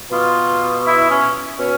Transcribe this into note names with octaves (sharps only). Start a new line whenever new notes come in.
B2 F4
E4
C#4
B2 C#4